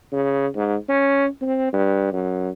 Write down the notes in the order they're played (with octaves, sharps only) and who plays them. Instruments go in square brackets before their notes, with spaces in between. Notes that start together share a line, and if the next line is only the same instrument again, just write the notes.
[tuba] C#3
G#2
C#4
C4
G2
F#2